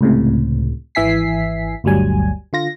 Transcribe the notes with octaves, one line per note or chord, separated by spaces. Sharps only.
C#2 A2 C3
G#1 E3 E5 G#5 B6 C7
G1 D2 F#3 G3 G#5
D3 F4 A#6